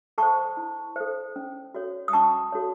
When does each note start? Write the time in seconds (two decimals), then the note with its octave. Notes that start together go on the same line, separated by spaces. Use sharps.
0.18 A4 C5 A5 C#6
0.57 E4
0.96 A4 C5
1.36 C#4
1.75 F#4 A4 C#5
2.08 D#6
2.13 C#4 A5 C#6
2.52 F#4 A4 C#5